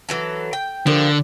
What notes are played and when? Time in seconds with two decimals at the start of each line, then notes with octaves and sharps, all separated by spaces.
0.09 E3 F#3 A4
0.53 G5
0.87 D3 F3 A#3 G4